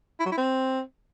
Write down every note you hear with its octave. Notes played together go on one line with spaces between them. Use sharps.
E4
F#3
E4
C4